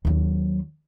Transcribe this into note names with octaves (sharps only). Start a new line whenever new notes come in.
D#2 F#3